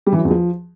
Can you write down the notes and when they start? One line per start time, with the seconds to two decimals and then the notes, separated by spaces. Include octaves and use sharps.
0.07 G3
0.13 E3
0.19 F#3
0.25 E2
0.31 F3